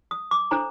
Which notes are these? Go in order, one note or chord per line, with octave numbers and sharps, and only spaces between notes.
D#6
D6
D4 A4 C5 A#5